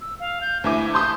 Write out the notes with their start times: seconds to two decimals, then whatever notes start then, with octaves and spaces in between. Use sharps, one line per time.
0.01 E6
0.20 F5
0.41 G6
0.64 D2 E4 G#5 D6
0.94 A5 C6 D#6 G6